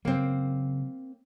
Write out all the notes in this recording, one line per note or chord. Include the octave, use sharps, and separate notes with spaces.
C#3 F#3 A#3 C4